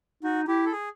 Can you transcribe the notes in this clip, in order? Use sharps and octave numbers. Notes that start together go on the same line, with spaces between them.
D#4 F#4
E4 G4
A4
G#4